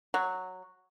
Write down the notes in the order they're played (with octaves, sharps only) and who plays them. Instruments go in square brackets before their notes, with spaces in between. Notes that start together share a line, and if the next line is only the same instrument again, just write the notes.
[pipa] F#3